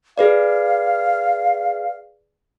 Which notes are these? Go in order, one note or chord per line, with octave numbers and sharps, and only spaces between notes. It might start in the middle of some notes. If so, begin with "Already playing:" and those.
G#4 B4 D5 F5